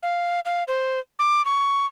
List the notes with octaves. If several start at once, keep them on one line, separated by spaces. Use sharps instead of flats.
F5
F5
C5
D6
C#6